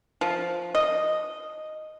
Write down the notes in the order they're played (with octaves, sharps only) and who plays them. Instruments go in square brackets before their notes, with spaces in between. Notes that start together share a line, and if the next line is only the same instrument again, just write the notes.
[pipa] F3
D#5